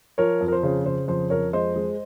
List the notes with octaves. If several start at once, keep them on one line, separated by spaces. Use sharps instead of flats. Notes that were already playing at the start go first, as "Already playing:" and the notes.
F3 A#4 C#5
F2
A#4
C5
C#3
C#3 C5
F2 C5
F2 A#4 C#5
G#3 C5 D#5
G#3